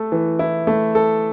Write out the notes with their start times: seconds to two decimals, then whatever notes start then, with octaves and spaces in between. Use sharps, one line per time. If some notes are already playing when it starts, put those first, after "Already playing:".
Already playing: A3 A4
0.12 E3
0.39 E4
0.67 A3
0.95 A4